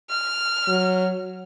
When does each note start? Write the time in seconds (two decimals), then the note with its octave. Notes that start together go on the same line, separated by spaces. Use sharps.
0.10 F6
0.68 F#3